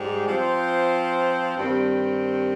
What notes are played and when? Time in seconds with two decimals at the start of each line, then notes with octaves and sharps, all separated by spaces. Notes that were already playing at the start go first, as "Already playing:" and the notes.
Already playing: G#2 G3 G4
0.26 F3 C4 F4 C5
1.56 G2 D#3 G3 C4